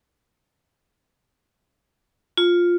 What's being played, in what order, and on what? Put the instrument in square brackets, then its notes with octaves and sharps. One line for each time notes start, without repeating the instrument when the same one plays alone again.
[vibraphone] F4